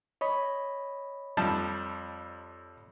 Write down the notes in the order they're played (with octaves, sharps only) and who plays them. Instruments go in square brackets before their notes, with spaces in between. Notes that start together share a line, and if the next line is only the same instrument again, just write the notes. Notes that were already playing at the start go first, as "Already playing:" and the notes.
[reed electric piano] C#5 D#5 B5
[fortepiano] F2 G3 A5